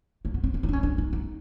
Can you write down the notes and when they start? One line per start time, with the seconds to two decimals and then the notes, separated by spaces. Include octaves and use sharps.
0.25 A#3
0.34 B3
0.44 C4
0.54 D4
0.63 D#4
0.69 D4
0.73 C#4
0.83 D4
0.98 D#4
1.13 D#4